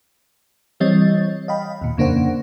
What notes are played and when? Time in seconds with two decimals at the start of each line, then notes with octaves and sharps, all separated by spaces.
0.80 E3 G3 C4 C#5 D#5 A6
1.48 D#5 F5 G5 B5
1.81 D#2 A#2
1.97 F2 C#3 A#3 D4 C5 F#5